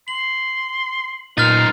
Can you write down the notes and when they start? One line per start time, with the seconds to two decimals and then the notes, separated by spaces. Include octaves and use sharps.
0.08 C6 F#7
1.38 F#2 A#2 D#4 C5 F6 A6